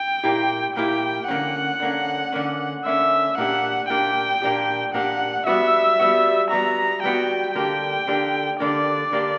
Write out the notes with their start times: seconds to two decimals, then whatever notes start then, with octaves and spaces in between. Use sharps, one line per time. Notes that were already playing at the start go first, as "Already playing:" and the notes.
Already playing: G5
0.23 A#2 A#3 E4 G4
0.76 A#2 A#3 E4 G4 G5
1.28 D3 A#3 C#4 F#5
1.80 D3 A#3 C#4
2.33 D3 A#3 C#4
2.85 D3 A#3 C#4 E5
3.37 A#2 A#3 D4 G4 F#5
3.90 A#2 A#3 D4 G4 G5
4.42 A#2 A#3 D4 G4
4.94 A#2 A#3 D4 G4 F#5
5.47 G3 B3 F#4 E5
5.99 G3 B3 F#4
6.51 G3 B3 F#4 A#5
7.03 G3 B3 F#4 G5
7.55 D3 A#3 D4 G4 G5
8.07 D3 A#3 D4 G4
8.60 D3 A#3 D4 G4 D5
9.12 D3 A#3 D4 G4